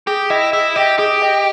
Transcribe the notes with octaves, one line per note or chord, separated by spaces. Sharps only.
G4 G#4
E4 D#5 G5
E4 G#4
G4 D#5 G5
G4 G#4
D#5 G5